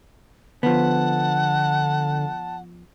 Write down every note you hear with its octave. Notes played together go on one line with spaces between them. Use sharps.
D3 F3 B3 F#5 A5